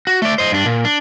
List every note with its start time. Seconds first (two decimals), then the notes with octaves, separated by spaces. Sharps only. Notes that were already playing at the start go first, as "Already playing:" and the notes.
0.07 F#4
0.22 A3 D5
0.38 C5 D#5
0.52 G2 D4
0.66 A#2
0.85 D4